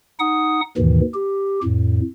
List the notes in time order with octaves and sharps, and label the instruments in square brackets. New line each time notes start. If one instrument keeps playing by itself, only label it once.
[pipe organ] D#4 F#5 D#6
D#2 G#2 B2 D#3 E3
G4
F2 A2